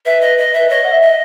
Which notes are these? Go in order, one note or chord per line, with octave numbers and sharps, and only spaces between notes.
B4 E5
D#5
D#5
E5
B4
C#5 D#5
F#5
E5
D#5